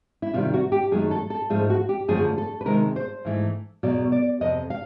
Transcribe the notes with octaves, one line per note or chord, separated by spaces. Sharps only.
E4
C3 D#3 G3 F4
F#4
G4
F#2 D#3 F#3 A3 G#4
A4
A4
G#2 F3 A3 G#4
F#4
G4
F#2 D3 F3 A3 G#4
A4
B4
C3 D#3 G#3 A#4
C5
G#2 E3 A3
E2 B2 F#3 D5
D5
F2 C3 D#5
F5